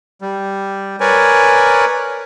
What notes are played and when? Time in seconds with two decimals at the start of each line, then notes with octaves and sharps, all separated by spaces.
0.21 G3
1.00 A#4 B4 C#5 D5 G#5